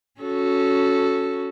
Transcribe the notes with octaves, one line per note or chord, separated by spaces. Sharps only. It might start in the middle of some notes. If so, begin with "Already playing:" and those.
C#4 F#4 A4